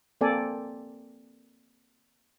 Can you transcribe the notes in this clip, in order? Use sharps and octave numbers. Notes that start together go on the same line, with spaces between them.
A#3 C4 A4 D5 G#5